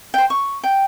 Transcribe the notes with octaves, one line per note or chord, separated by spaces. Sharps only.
C5 G5
C#6
G5